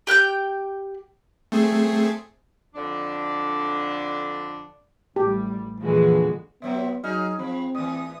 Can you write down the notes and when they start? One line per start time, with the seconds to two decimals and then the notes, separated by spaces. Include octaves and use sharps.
0.07 G4 G5 F#6 G6
1.52 A3 C4 G#4
2.74 F2 D3 D4
5.16 A1 G3 G4
5.81 A#1 F2 D3 E3 F3 G#3 F#4
6.62 B2 F#3 B3 C4 E5
7.04 F#3 D#4 G#4 F6
7.39 F3 C4 B5
7.75 A2 E3 D#6